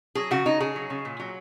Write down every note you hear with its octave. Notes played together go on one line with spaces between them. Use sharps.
F#3 G#4
C#3 F#4
C#3 D#4
C#3 G#4
F#3
C#3
A#2
F#3